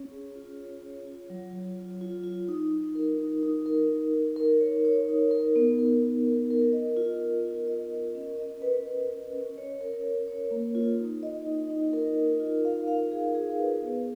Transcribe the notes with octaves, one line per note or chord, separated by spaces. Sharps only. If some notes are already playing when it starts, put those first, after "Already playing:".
Already playing: C#4 C#5
G#4
F4
C#5
C#5
F4
F#3
F#3
F4
F4
F4
D#4
D#4
A#4
D#4
D#4
A#4
D#4
D#4
A#4
C#5
C#5
D#4
A#4
B3
A#4
A#4
A#4
A#4
D#5
F4
D#5
F4
D#5
A#4
C#4
D#5
B4
B4
B4
C#4
C#5
A#4
C#5
C#5
A#3
F4
D#4
D#5
D#4
D#4
A#4
D#4
F4
F5
F5
G#4
G#4
B4
B3